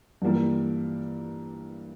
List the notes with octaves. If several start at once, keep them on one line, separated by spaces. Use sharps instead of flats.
G2 E3 G3 A#3 E4